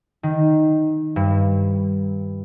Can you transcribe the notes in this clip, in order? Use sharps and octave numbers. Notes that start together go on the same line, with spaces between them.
D#3
G2